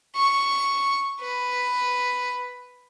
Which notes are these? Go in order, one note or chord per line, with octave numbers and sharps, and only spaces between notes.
C#6
B4